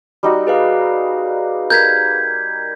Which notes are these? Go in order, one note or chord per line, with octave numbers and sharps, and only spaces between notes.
G3 D#4 F#4
G#4 B4 F5
A#4 G6 G#6 B6